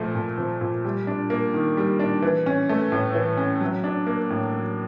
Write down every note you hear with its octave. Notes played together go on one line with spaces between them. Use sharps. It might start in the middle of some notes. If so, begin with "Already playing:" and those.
Already playing: A#2 F3 A3
A#2
F3
A#2
G3
D4
A#3
D#3
G3
D4
E3
C#4
A3
A2
E3
C#4
F#3
D4
A#3
A2
F#3